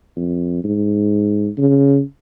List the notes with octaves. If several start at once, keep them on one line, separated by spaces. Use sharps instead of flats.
F2
G#2
C#3